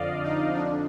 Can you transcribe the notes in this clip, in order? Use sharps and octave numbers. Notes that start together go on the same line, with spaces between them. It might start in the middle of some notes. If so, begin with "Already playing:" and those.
Already playing: F2 D3 F3 D5 D#5 F5
D#4
F2 D3 F3 D4